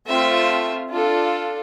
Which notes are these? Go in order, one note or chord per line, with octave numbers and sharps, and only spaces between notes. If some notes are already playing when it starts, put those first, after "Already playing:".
A3 C4 F4 E5
D4 F4 A4